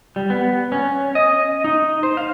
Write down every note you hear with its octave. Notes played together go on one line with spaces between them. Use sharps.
G3
B3
C#4
D#5
D#4
C5
F5